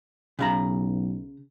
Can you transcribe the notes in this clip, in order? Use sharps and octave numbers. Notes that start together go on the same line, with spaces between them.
B1 C#3 F5 A#5